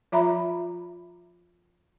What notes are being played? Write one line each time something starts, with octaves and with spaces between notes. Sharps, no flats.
F3 F4 E5 A#5 B5